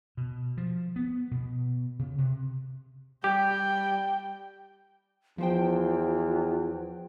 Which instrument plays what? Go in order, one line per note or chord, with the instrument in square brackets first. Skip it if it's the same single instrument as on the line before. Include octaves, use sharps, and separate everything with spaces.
[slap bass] B2
F3
B3
B2
C#3
C3
[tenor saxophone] G3 [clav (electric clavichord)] G4 [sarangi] G5 [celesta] G6
[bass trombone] E2 [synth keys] F3 C5 G5 [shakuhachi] F4